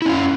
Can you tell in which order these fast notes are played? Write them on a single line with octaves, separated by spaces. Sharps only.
E4 C#4 F5